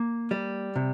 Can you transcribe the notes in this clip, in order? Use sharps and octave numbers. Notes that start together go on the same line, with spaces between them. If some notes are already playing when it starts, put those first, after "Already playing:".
Already playing: A#3
G3
C3